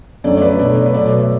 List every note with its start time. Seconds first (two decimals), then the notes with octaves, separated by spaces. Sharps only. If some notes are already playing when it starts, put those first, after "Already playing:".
0.24 F#2 D3 F#3 A3 D5
0.37 D5
0.42 B4
0.59 B2 F#3 A3 D5
0.76 D5
0.86 B4
0.94 B2 F#3 A3 D5
1.06 D5
1.18 E5